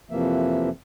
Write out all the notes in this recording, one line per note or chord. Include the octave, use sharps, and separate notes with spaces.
F2 C3 E3 F3 A#3 E5